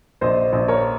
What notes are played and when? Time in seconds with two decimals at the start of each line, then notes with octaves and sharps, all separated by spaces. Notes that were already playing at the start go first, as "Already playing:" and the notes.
0.21 A#1 C5 D#5
0.53 A#1
0.68 A#4 C#5